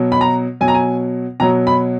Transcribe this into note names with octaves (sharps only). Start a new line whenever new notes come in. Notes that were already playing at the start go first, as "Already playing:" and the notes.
Already playing: B2 F#3
B5
A#5
B2 F#3 G#5
A#5
G#5
B2 F#3 A#5
B5